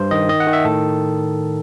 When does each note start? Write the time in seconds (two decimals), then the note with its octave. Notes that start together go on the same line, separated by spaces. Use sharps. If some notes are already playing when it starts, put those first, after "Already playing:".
Already playing: G2 C5
0.11 D#3 D#5
0.29 D#3 D#5
0.40 F#5
0.47 D#3
0.53 E5
0.65 A2 A4